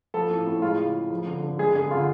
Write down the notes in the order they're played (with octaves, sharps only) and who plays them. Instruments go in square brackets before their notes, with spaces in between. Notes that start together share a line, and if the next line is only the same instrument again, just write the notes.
[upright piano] F3 A4
A2
A2
G#3 F4
C#3
C#3
F3
D3
D3
G#3 G#4
D3 G#4
D3 F4